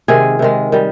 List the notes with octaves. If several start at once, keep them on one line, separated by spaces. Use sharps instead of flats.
C3 D#3 G#3 G#4
C3 D#3 G#3
D#3 G3